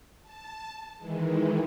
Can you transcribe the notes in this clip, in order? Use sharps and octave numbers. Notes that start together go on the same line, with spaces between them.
A5
D#3 E3 G#3